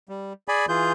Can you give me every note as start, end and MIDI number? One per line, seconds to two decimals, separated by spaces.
0.09 0.33 55
0.48 0.66 68
0.48 0.66 74
0.48 0.66 80
0.48 0.66 83
0.69 0.92 52
0.69 0.92 65
0.69 0.92 68
0.69 0.92 91